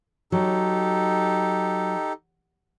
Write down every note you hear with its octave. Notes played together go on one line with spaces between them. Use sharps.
F#3 D#4 G4 A4